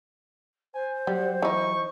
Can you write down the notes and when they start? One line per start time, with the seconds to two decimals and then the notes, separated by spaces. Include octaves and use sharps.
0.74 C5 G#5
1.07 F#3 G3 F#5
1.42 E3 D#4 C#6